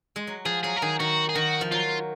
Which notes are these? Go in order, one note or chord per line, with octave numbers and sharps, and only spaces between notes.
G#3
F#3
F3 G#4
F#3 G#4
A#4
D#3 G#4
D#3 F#4
G#4
D#3 F#4
F3
F#3 F4